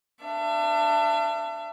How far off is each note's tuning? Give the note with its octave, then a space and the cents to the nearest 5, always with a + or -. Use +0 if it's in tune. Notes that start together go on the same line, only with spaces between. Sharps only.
D4 +20 E5 +40